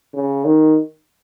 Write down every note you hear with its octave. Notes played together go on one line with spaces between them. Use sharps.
C#3
D#3